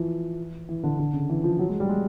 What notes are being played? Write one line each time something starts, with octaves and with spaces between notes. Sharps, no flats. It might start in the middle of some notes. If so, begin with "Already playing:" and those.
Already playing: E3 F3
E3
D3
D3
C#3
E3
F3
F#3
G#3
G3
G#3